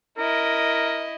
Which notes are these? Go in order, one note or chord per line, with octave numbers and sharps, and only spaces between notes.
E4 A#4 D#5